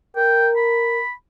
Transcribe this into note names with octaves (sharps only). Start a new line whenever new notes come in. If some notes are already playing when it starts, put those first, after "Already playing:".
A#4 G5
B5